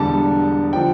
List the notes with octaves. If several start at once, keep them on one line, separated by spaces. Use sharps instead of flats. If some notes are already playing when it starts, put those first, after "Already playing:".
Already playing: E1 E2 D3 G3 A5
D3 F3 G5